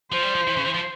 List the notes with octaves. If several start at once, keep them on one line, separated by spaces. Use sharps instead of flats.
F3 C5
G3
F3
E3
C#3
E3
F3